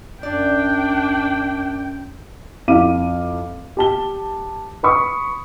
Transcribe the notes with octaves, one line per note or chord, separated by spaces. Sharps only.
F#2 D4 D5 G5
F2 E4 F5 D6 D#7
G4 A5 G7
B4 B5 C#6 D#6